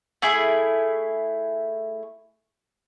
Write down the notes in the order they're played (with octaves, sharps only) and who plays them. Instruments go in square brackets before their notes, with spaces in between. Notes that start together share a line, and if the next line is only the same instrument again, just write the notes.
[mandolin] A3 E4 G#4